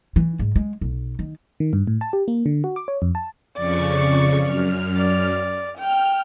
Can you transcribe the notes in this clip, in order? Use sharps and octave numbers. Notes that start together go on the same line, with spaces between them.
E3
G#2
G#3
B1
D#3
D#3
G2
A2
A5
G4
A#3
D3
F#4
D6
C#5
F2
A5
F2 C#3 D5 C#6
F#2 F6
D5
G5 F6